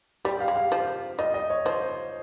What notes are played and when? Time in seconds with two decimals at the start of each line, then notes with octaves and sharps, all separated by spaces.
0.25 G3 G4
0.40 F5
0.48 G#3
0.56 F5
0.72 F3
1.19 G3 D#5
1.34 D#5
1.50 C#5
1.65 F3 C5